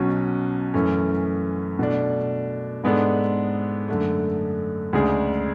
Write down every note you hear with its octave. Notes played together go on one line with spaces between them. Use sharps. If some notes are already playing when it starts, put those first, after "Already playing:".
Already playing: B1 B2 F#3 C#4
F#2 E3 A3 C#4
B2 A3 D4
G#2 G#3 B3 D4 A4
F#2 D3 A3
D2 C#3 G#3 D4 G#4